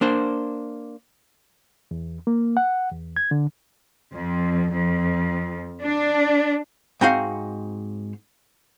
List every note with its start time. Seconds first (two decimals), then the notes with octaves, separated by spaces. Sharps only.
0.01 A#3 D4 C5
1.91 E2
2.27 A#3
2.57 F#5
2.92 E2
3.16 G#6
3.31 D3
4.14 F2
4.71 F2
5.82 D4
7.01 G#2 C4 D#4 F#4 F5 F#5